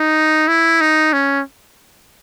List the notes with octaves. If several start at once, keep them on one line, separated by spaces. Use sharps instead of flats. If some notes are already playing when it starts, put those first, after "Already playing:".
Already playing: D#4
E4
D#4
C#4